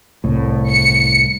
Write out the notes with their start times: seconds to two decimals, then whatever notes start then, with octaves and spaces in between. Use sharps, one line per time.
0.24 C2 A2
0.69 C#7